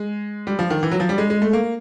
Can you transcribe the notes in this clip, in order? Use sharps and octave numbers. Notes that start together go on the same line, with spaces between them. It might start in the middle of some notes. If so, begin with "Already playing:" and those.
Already playing: G#3
G3
F3
D#3
E3
F#3
F3
G3
G#3
G#3
A3
A#3